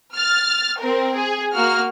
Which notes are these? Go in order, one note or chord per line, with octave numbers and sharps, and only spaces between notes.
F6 A6
C4 A#4
G#4
A#3 F#4 F6